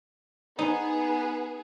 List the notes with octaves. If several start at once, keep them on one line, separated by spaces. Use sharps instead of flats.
B3 D#4 G#4